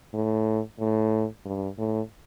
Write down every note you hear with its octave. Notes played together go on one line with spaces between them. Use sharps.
A2
A2
G2
A2